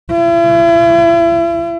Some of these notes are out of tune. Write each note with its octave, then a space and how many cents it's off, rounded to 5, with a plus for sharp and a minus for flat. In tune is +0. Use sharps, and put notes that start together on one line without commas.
E4 +40